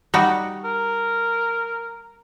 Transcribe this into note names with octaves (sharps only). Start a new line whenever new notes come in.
G3 D#4 F#4
A#4